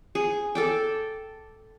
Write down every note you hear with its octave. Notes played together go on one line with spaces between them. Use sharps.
G#4
A4 D5 G5